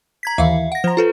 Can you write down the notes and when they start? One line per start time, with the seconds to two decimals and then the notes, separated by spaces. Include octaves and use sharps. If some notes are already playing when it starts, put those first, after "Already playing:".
0.23 A#5 G#6 B6
0.38 D#2 E3 E5 F5
0.72 F#5 A#6
0.84 F3 C5 A#5
0.97 F4 A4 B4